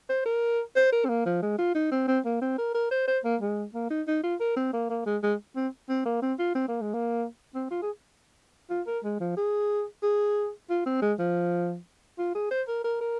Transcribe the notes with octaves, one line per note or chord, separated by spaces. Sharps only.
C5
A#4
C5
A#4
C4
A#3
F3
G#3
F4
D#4
C4
C4
A#3
C4
A#4
A#4
C5
C5
A#3
G#3
A#3
D#4
D#4
F4
A#4
C4
A#3
A#3
G#3
G#3
C4
C4
A#3
C4
F4
C4
A#3
G#3
A#3
C4
F4
G#4
F4
A#4
G#3
F3
G#4
G#4
F4
C4
G#3
F3
F4
G#4
C5
A#4
A#4
A#4